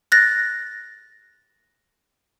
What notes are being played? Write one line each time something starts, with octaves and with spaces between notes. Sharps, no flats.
F#6 A6 A#6